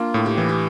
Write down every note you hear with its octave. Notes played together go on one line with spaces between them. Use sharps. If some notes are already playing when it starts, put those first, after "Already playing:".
Already playing: A#3 D4 F4
A2
G4
E3
G4